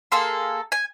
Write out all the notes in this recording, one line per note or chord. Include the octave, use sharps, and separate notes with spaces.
A#3 G#4 A4 C6
G#5